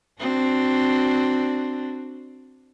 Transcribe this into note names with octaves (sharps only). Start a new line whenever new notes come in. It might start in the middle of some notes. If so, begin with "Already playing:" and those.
C4 D4 F#4